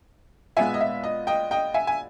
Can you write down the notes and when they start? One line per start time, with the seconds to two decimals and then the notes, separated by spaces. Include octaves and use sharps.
0.57 A#2 G#3 B3 E5 G#5
0.74 D#5
0.81 E5
1.04 D#5
1.27 D#5 G5
1.51 D#5 G5
1.74 E5 G#5
1.87 G#5